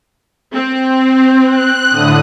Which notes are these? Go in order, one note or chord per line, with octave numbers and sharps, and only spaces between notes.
C4
F#6
A2 D3 D#6